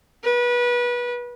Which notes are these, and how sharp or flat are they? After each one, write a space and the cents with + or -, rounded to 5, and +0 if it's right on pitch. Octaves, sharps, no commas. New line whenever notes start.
B4 -25